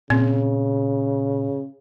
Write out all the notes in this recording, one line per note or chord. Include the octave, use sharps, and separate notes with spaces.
A#2 C#3 C4